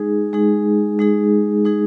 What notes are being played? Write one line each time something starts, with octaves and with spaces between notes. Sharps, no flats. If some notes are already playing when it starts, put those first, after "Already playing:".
Already playing: G#3 D#4 G#4
G#3 D#4 G#4
G#3 D#4 G#4
G#3 D#4 G#4